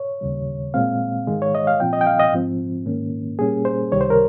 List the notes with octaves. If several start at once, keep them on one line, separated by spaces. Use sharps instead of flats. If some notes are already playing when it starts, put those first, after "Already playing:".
Already playing: C#5
D#2 C#3 G3
A#2 G#3 C4 F5
G#2 D#3 G#3
C#5
D#5
F5
A#2 F3 C4 G5
D#5
G5
F5
D#5
G#2 F3 C4
G#2 D#3 A#3 C#4
A#2 G3 A#3 C#4 G#4
C5
C#2 C3 D#3 G3 C#5
C5
A#4